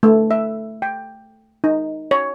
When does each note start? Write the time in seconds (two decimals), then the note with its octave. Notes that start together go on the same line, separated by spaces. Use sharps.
0.03 A3
0.31 E5
0.82 G5
1.64 D#4
2.11 C#5